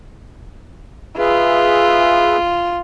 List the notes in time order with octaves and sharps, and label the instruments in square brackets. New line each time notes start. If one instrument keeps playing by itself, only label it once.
[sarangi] F4 [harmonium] G#4 B4 E5